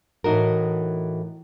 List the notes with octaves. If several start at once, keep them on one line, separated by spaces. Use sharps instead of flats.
A2 E3 D#4 F#4 A#4